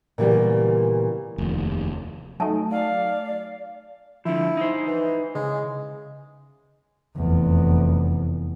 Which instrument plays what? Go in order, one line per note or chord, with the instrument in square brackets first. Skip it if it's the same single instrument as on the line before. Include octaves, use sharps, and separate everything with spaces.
[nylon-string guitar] A#2 C#3 E3 G3 B3
[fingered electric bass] F1 D#2
[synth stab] F#3 A3 D#4 [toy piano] G#5 A5
[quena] D5 [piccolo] F5
[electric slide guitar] D3 F3 [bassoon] E4
[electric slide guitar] D#4 C5
[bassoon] E3
[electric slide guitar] C#3 [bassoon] G#3
[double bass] F1 E2